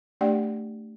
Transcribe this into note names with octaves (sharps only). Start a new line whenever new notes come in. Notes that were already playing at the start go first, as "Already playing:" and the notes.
A3 D4 G4 D5 F#5 G5